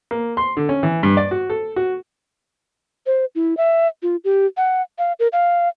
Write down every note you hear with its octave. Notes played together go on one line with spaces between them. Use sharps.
A#3
C6
D3
C#4
E3
G2
D5
F#4
A4
F#4
C5
E4
E5
F4
G4
F#5
F5
A#4
F5